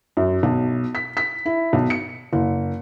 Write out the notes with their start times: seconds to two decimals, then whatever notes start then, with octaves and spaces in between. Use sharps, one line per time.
0.17 F#2
0.43 B1
0.95 B6
1.17 B6
1.46 E4
1.73 B1
1.90 C#7
2.33 F#1